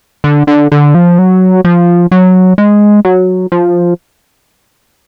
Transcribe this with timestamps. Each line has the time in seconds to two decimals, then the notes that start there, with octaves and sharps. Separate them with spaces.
0.24 D3
0.47 D3
0.72 D3
0.95 F3
1.19 F#3
1.65 F3
2.11 F#3
2.58 G#3
3.05 F#3
3.52 F3